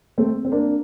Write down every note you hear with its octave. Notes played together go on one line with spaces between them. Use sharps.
A3 C4
C4
A#3 D4